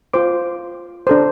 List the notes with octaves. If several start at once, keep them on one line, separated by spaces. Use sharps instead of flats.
F4 C5 D6
D4 A4 C5